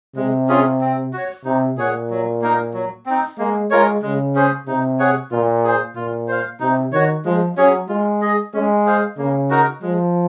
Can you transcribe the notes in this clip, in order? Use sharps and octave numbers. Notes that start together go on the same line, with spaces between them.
C3 G#3
C#4 F4 G#4
C4
F#4 C#5
C3 D#4
A#2 G#4 C#5 F#5
F#3
A#3 D#4 A#4
F#3
C4 D#4
G#3 A#3
G#3 F4 A#4 C#5
C#3 G#3
C#4 G#4 C5
C3 D#4
G#4 C#5 F#5
A#2 F4
G#4 C5
A#2 F4
C5 F5
C3 D#4
D#3 F#4 C#5
F3 G#3
F#3 C#4 G#4 C#5
G#3 F4
G#4 D#5
G#3 C#4
G#4 C5 F5
C#3 A#3
D#4 F#4 A#4
F3 G#3